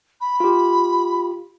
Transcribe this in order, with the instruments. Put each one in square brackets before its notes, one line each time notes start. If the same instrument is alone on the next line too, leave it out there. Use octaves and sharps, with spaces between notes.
[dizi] B5
[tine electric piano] F4 G4